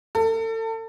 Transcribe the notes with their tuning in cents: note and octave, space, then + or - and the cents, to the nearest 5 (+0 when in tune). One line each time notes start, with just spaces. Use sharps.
A4 +30